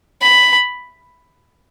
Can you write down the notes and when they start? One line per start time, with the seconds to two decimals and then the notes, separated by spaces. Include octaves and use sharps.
0.22 B5